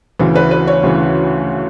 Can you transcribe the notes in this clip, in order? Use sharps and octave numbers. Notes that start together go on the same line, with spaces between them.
D2 C#3 E3
B4
B4
C#5
D2 C#3 E3